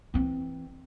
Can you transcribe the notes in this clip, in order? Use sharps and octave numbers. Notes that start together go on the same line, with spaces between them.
E3 C4